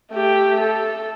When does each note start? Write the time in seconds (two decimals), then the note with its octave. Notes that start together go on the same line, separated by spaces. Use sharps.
0.13 A3 G4
0.61 A4